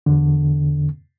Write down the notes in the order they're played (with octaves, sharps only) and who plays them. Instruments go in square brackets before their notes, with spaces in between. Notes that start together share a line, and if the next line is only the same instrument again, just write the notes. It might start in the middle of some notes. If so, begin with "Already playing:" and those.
[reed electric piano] E2 D3